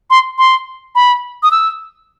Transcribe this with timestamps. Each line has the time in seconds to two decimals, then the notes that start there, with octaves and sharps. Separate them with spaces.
0.10 C6
0.38 C6
0.95 B5
1.43 D#6
1.51 E6